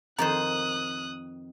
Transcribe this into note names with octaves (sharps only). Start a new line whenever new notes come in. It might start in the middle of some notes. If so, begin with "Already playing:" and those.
F2 D#3 C5 A#5 D#6 F#6